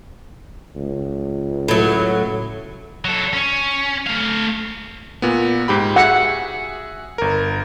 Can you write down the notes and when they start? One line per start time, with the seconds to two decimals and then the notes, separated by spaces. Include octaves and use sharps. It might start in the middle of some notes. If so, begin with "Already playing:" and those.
0.76 C#2
1.68 A2 F#3
3.05 F#3 A4
3.33 C#4
4.07 A3 F5
5.22 A#2 B3
5.68 G#2 G4 B5
5.96 F#4 G#4 E5 F#5
7.18 G1 A#4